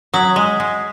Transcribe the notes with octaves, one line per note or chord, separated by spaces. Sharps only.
F#3 D#6 G#6 B6 F#7
G#3
G#3